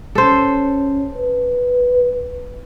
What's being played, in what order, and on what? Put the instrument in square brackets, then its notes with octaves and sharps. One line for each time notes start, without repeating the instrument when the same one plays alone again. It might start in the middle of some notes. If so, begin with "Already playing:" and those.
[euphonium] C#4 [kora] A4 C5
[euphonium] B4